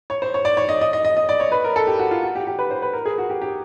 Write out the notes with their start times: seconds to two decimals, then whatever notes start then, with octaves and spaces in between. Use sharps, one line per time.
0.10 C#5
0.22 C5
0.34 C#5
0.45 D5
0.57 C#5
0.69 D#5
0.81 D#5
0.93 D#5
1.05 D#5
1.17 D#5
1.29 D5
1.40 C#5
1.52 B4
1.64 A#4
1.76 A4
1.87 G4
1.99 F#4
2.11 F4
2.23 F#4
2.35 G4
2.47 G4
2.59 B4
2.71 C5
2.82 B4
2.93 A#4
3.05 G#4
3.18 F#4
3.30 G4
3.42 G4